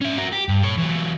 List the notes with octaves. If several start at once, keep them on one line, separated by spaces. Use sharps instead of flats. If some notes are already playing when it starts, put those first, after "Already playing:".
C#4 E5
F#4 A#4
G4
G2
A4 C#5
E3 F#3